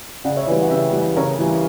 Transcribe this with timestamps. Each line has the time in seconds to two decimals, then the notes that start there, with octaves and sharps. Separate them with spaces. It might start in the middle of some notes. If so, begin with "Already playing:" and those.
0.24 C#3 D5 F#5
0.36 C#5 E5
0.47 E3 B4 D5
0.52 G3
0.61 F#5
0.70 C#3 E5 G5
0.93 E3 G3
1.17 C#3 A#4 C#5
1.39 E3 G3